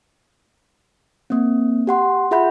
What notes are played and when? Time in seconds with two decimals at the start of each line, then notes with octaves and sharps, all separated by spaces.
1.30 A#3 C4
1.87 G4 F#5 C6
2.31 F4 G#4 E5 F#5 B5 G6